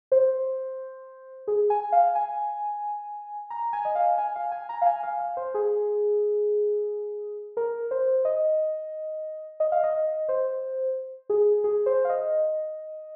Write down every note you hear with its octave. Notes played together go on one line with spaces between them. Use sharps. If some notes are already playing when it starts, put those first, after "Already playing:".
C5
G#4
G#5
F5
G#5
A#5
G#5
D#5
F5
G#5
F5
G#5
A#5
F5
G#5
F5
F5
C5
G#4
A#4
C5
D#5
D#5
F5
D#5
C5
G#4
G#4
C5
F5
D#5